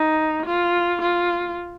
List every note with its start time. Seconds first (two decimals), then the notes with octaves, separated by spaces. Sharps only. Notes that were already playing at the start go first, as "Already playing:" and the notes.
Already playing: D#4
0.46 F4
1.01 F4